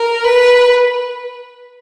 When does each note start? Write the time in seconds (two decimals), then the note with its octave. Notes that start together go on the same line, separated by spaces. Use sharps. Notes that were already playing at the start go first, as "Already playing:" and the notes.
Already playing: A#4
0.25 B4